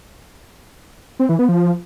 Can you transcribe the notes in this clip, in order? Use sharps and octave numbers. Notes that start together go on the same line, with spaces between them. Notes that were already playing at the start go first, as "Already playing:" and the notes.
C4
E3
B3
F3